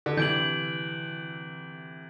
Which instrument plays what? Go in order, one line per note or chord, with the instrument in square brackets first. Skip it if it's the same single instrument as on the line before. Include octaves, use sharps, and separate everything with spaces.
[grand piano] D3
[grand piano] C3 E3 [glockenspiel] G6 D7 F#7